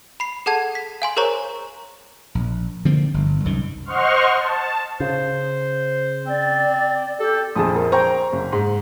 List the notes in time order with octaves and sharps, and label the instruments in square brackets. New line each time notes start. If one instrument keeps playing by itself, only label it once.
[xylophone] B5 C7
G#4 A4 F#5 A5 G#6
B6
F5 G#5 C6
G#4 A#4 C5 C#5 A#5 C#6
[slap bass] A#1
D3 F3 A#3 C4
G1
C2 F#2 D#3
[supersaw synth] C5 D#5 F#5 C6 C#6 F6
A5
[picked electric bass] C#3 [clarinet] C5
[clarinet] C4 [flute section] D5
[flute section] G4 [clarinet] A4
[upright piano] A#1 F2 [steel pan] G#4 A5 D#6
[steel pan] A#4
[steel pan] C5 G5 [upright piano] A#5 C#6
[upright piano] F#1
G#2